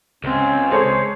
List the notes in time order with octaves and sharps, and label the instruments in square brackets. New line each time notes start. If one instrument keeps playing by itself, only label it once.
[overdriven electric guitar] C#2 [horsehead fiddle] C4 [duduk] C#4
[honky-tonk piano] G#3 A4 C#5 [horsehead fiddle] G#4 [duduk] C5